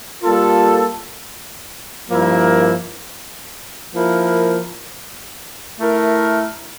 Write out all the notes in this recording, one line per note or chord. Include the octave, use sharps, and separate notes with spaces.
G3 A#3 F4 A4
G2 F3 A#3 E4 A#4
F3 A#3 E4 A#4
A3 E4 A#4